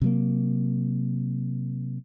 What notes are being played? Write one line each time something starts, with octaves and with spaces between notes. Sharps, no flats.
C3 F#3 A#3